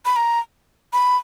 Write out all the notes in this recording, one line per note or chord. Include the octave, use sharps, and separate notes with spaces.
B5
A#5
B5